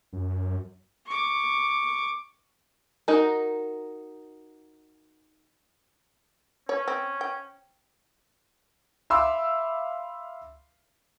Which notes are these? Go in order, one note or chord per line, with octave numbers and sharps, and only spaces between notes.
F#2
C#6 D6
D#4 F#4 A#4
C#4 C#5
C4
G5
E5 F5 B5 C6 D6 E6